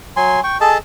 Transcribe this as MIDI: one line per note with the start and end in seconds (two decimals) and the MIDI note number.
0.17 0.40 54
0.17 0.40 80
0.17 0.40 84
0.44 0.58 79
0.44 0.58 85
0.61 0.78 68
0.61 0.78 69
0.61 0.78 75
0.61 0.78 81